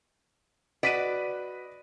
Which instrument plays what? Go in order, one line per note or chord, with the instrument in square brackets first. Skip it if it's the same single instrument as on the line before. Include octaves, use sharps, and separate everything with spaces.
[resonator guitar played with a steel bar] F#4 B4 D5 [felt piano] D#5 B6 D#7